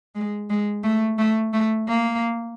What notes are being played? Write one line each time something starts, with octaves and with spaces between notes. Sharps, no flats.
G#3
G#3
A3
A3
A3
A#3